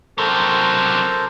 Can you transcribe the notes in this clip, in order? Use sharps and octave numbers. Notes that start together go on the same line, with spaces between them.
C3 F#3 A4 A#4 C5